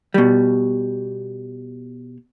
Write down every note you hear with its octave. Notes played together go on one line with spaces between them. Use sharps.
B2 G3